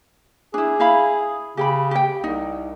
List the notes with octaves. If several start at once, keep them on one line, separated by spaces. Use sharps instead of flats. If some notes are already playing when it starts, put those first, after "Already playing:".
D4 E4 G#4
E4 F5 B5
C#3 G4 G5 B5
G4 G5
C2 D#4